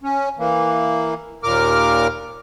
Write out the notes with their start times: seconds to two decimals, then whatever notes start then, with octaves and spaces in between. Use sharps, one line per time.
0.03 C#4
0.39 E3 A#3
1.43 D#2 A#2 A#4 D6 F6